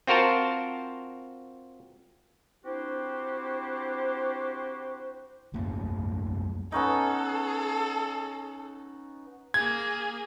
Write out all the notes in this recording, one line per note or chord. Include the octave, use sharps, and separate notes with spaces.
C4 F4 F#4 A#4 C5 A5
C4 D4 E4 F#4 G4 C5
C2 F#2 A3 A#3
B3 C#4 D#4 A4
A#3 G#4 G#6